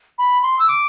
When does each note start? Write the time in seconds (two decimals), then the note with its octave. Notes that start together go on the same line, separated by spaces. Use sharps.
0.18 B5
0.43 C6
0.59 E6
0.68 D6